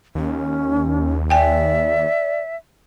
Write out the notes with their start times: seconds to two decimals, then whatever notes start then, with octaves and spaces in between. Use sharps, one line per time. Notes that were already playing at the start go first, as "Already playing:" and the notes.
0.15 D#2 C#4
1.30 D5 E5 G5 G#5